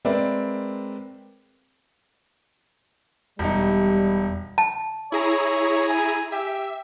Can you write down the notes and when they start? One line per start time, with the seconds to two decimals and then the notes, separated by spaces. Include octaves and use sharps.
0.05 G#3 C4 A#4 B4 D5 E5
3.39 E1 G3 D#4
4.58 A5
5.12 E4 G#4 C#5 A#5
5.88 G#5
6.32 G4 E5